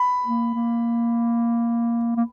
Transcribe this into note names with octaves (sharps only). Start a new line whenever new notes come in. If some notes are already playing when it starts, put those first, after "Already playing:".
Already playing: B5
A#3
A#3
A#3